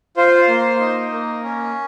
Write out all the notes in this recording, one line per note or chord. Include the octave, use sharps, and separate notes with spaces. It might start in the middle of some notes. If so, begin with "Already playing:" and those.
F4 C5
A#3
D#4
A#3
C#4